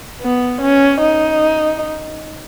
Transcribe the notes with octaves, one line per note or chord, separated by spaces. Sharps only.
B3
C#4
D#4